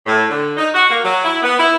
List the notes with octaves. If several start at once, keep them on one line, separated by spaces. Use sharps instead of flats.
A2
D3
D#4
F#4
A#3
F#3
E4
B3
E4